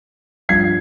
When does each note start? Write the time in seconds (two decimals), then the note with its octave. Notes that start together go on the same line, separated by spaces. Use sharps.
0.49 G2 F3 G#6 C7